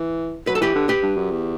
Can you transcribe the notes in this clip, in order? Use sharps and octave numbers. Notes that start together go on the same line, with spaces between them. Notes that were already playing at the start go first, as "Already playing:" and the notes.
Already playing: E3
F#3 B4
A4
E3 G4 B4
D3
G4 B4
G2
F#2
E2